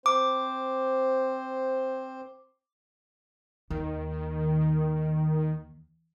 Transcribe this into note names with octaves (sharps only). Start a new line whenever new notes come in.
C4 C5 D6
D#2 D#3